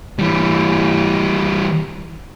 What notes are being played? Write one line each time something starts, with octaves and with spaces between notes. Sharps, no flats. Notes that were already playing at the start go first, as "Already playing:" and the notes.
E3 G3